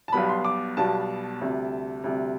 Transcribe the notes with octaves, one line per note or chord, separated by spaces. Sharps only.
A5
B1 B2 G3 B3 B5
C6
D6
B1 B2 G3 B3 A5
D2 C3 G3
D2 C3 G3